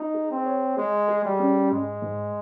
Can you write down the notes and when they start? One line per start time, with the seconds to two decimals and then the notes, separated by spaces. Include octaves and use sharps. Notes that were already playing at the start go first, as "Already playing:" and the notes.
Already playing: D#4
0.14 G#4
0.31 C4
0.46 C#5
0.77 G#3 G#4
1.08 G#4
1.25 G3
1.40 C#4
1.71 G#2 G#3
2.02 G#2